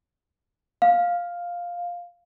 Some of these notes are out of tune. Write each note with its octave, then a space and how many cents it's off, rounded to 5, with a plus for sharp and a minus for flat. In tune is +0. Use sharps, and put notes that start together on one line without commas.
F5 +5